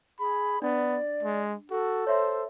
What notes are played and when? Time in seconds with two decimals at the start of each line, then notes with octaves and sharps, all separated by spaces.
0.20 G#4 B5
0.62 B3 D4 D5
1.23 G#3
1.71 F#4 A4
2.07 C5 C#5 E5 C6